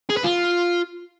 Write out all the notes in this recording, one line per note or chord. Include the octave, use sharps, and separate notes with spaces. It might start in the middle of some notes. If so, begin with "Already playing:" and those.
G#4
B4
F4